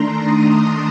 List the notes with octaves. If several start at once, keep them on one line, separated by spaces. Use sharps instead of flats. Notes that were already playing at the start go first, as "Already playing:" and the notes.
Already playing: D#3 A3 D4 A#5 C6
D#6